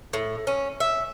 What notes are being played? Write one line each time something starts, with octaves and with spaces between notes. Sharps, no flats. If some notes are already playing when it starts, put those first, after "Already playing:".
A2
C#4
E5